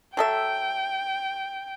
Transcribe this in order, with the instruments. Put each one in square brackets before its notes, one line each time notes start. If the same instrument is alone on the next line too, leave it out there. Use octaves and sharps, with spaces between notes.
[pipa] F#3 A4 E5 [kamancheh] G5